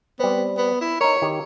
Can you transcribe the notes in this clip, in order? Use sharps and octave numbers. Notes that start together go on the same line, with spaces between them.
G3 B3 C4
B3
E4
D#4 A#4 C#5
D#3 G4